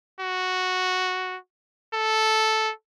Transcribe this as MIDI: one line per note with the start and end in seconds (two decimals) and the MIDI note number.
0.21 1.37 66
1.94 2.71 69